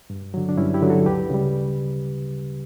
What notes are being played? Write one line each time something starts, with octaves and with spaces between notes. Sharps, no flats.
G2
D3 F#3
D4
G2 C#4 E4
E4 G4
D3 F#3
F#4 A4
D2 G4 B4
C#3 G3